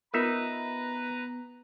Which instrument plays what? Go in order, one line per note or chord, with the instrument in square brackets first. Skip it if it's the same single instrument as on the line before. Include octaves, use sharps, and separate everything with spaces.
[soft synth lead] B3 [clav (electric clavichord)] D#4 E5 [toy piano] F4 A#4 [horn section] B4 A#5